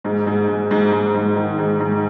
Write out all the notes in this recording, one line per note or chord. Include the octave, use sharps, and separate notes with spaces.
G#2
G#2
G#2
G#2
G#2
G#2
D#3
G#2
G#2